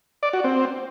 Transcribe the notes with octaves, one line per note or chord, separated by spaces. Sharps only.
D5
F#4
C4